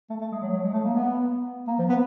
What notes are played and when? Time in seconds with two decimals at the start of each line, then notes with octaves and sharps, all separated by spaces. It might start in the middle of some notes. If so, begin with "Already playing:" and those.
0.10 A3
0.21 A3
0.32 G#3
0.42 F#3
0.53 F#3
0.63 G#3
0.73 A3
0.84 A#3
0.95 B3
1.68 A#3
1.79 F3
1.89 B3